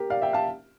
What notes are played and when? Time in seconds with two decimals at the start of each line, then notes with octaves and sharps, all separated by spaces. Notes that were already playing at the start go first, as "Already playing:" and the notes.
Already playing: G4 A#4
0.10 D5 F5
0.22 E5 G5
0.33 F5 A5